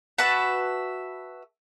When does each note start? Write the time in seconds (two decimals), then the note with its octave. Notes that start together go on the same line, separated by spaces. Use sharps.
0.18 F#4 B4 E5 A5